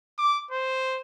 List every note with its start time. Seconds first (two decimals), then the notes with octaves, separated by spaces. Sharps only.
0.19 D6
0.51 C5